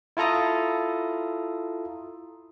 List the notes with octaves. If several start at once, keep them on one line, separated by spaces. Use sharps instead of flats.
E4 F4 A4 A#5 D#6